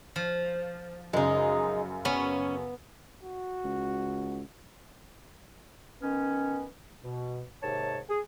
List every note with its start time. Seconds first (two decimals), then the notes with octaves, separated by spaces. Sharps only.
0.16 F3
1.13 F#2 C#3 G#3 D#4
2.05 B3 C#4
3.23 F#4
3.64 C#2
6.02 D#3 B3 C#4
7.03 B2
7.62 D#2 G#2 C3 C#5 A5
8.09 G#4